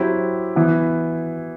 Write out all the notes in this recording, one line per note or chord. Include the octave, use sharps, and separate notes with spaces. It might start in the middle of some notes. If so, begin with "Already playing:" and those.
Already playing: F#3 C4 E4 G4
E3 B3 E4